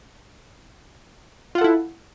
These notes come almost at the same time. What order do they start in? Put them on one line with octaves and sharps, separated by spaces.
F4 F#5 A4 E4